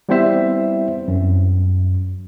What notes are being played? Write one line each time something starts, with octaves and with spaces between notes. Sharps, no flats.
G3 B3 C4 E4 C5 E5
F#2